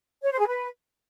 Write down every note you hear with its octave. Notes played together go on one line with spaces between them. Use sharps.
C#5
C5
G#4
B4